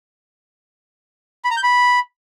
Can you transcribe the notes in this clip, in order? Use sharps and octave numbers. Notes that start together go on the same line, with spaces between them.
B5
A#5
G6
B5